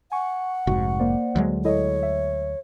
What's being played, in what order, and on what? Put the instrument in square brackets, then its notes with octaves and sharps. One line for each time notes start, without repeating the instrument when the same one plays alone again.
[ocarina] F#5 [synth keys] G#5 C#6
[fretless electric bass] F1 G#2 [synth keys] F#4 C#6
[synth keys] A#3 C5 D5
[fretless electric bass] D2 F#3 G#3
[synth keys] E4 A4 D#5 [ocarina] C#5
[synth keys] E5